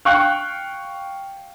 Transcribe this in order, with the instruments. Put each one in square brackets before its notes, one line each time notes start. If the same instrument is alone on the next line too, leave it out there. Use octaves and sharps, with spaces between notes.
[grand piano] F5 G5 C#6 F#6